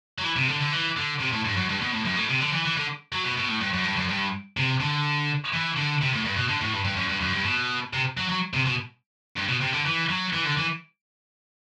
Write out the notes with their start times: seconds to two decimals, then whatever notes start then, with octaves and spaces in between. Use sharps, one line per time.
0.19 F#3
0.24 E3
0.36 C3
0.48 D3
0.60 D3
0.72 E3
0.96 D3
1.20 C3
1.32 A2
1.45 G2
1.57 F#2
1.69 G2
1.81 B2
1.92 A2
2.05 F#2
2.16 A2
2.29 C3
2.40 D3
2.52 E3
2.65 E3
2.77 D3
3.12 F#3
3.25 B2
3.37 B2
3.48 A2
3.60 G2
3.73 F#2
3.84 G2
3.96 F#2
4.08 G2
4.57 C3
4.80 D3
5.53 E3
5.76 D3
6.01 C3
6.13 A2
6.25 G2
6.36 B2
6.49 D3
6.61 A2
6.73 G2
6.85 G2
6.96 F#2
7.09 G2
7.21 F#2
7.33 G2
7.45 B2
7.93 C3
8.17 F#3
8.29 F#3
8.54 C3
8.66 B2
9.37 G2
9.49 B2
9.61 C3
9.73 D3
9.86 E3
10.09 F#3
10.33 E3
10.45 D3
10.57 E3